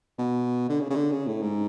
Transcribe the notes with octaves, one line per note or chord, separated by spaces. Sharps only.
B2
D3
C#3
C#3
D3
C#3
A2
G#2